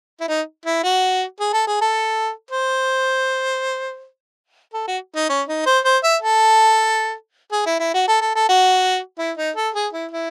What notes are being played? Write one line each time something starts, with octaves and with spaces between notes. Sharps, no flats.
E4
D#4
E4
F#4
G#4
A4
G#4
A4
C5
A4
F#4
D#4
C#4
D#4
C5
C5
E5
A4
G#4
E4
E4
F#4
A4
A4
A4
F#4
E4
D#4
A4
G#4
E4
E4